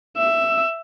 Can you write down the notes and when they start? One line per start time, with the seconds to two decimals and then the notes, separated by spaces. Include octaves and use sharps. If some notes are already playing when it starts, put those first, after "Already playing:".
0.17 E5 E6